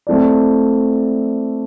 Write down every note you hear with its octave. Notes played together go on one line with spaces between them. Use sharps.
A3 C4 E4 A4 D5